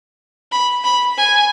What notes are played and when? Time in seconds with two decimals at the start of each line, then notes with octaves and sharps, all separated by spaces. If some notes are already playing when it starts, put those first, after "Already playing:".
0.52 B5
0.84 B5
1.17 G#5